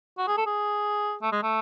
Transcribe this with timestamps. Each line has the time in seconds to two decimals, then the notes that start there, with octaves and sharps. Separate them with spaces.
0.18 F#4
0.28 G#4
0.38 A4
0.46 G#4
1.22 A3
1.32 G#3
1.43 A3